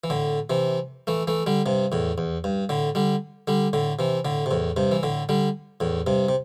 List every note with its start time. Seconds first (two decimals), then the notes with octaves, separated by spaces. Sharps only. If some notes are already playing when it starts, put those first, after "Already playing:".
0.04 E3
0.10 A2 D3
0.50 C3 E3
1.07 E3 A3
1.27 E3 A3
1.46 D3 G3
1.66 G2 C3
1.92 E2 A2
2.18 E2
2.44 G2
2.69 A2 D3
2.95 D3 G3
3.48 D3 G3
3.73 A2 D3
3.99 C3 E3
4.25 A2 D3
4.46 C3
4.51 E2 A2
4.76 G2 C3
4.92 E3
5.03 A2 D3
5.29 D3 G3
5.80 E2 A2
6.07 G2 C3
6.29 C3